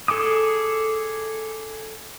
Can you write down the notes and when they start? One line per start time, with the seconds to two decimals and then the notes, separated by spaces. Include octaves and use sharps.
0.08 G#4 A4 G#5 D6 D#6